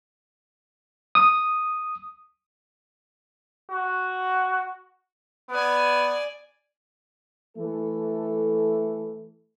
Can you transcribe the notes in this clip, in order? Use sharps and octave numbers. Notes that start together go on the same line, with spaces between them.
D#6
F#4
B3 D5 G#5
E3 A3 A4